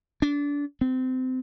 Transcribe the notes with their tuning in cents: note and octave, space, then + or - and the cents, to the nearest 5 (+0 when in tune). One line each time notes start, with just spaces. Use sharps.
D4 -30
C4 -25